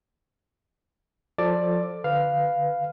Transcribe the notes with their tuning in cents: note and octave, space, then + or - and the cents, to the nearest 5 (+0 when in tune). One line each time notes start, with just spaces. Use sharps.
F3 +20 A4 +5 D5 +10
D3 +0 B4 +0 F5 +0